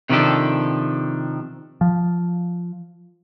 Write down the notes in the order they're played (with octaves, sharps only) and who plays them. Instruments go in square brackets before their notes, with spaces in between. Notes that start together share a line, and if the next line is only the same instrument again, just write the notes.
[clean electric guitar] C3 D#3 F3 D4 G4 A4
[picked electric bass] F3